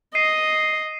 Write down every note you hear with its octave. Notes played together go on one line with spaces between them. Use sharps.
D#5 C7 D#7